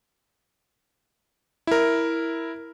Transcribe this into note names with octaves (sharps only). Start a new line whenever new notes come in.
E4 A#4